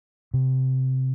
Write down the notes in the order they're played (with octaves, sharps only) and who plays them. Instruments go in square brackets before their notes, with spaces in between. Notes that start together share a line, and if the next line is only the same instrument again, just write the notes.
[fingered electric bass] C3